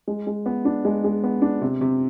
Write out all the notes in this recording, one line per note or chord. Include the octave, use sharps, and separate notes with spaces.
G#3
G#3
B3
D4
G#3
G#3
B3
D4
C3
C3